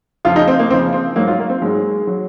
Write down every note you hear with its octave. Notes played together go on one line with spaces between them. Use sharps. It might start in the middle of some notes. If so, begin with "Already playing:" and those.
F2 C#3 F3 F4
D#4
C4
A#3
F2 C#3 F3 C4
C4
G#2 F#3 A#3
F4
A#3
C4
G#2 F#3 G#3
F#3